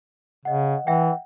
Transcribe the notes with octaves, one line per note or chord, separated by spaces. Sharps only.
C#3 D#5 F#5
E3 E5 F#5 G5